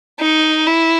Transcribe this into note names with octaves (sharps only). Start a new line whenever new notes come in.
D#4
E4